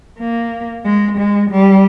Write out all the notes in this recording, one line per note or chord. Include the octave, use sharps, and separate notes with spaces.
A#3
G#3
G#3
G3